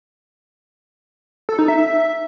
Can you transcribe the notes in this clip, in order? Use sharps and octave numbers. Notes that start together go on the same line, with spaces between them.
A4
D#4
E5